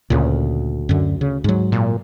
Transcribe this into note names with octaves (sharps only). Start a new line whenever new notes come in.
D2 A#2 C#3
F#2 D3
C#3
G#2 F#3
A#2